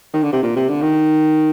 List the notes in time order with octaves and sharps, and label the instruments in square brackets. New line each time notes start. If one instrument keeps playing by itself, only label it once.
[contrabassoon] D#3
D3
C3
A#2
C3
D3
D#3